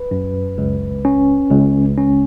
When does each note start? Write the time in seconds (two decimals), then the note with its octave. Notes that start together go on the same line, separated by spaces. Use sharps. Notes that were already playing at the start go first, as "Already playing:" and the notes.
Already playing: B4
0.11 F#2
0.58 C#2
1.05 C#4
1.51 C#2
1.98 C#4